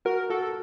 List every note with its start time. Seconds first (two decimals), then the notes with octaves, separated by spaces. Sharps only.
0.05 F#4 A#4
0.30 F#4 A4